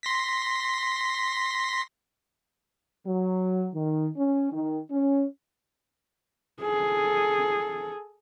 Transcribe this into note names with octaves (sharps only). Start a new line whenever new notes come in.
C6 A#6 B6
F#3
D#3
C#4
D#3
C#4
G#4 A4